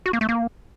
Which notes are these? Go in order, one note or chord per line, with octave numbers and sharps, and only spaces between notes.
F#4
A#3
A3
A#3